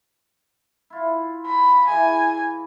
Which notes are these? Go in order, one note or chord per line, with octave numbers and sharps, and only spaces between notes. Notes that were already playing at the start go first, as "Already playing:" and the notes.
E4 F4
A#5 B5
E3 G#4 G#5